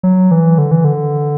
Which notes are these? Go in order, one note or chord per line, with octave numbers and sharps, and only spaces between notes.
F#3
E3
D3
E3
D3